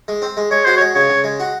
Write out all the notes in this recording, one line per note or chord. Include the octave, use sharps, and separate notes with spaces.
G#3
C4
G#3
G#3 C#5
F#4 C5
C#5
G#3
C#3 C#5
C#3
G#3
F#4